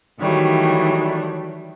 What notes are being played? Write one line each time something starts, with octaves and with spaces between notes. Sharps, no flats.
D#3 E3 F#3 G3 A3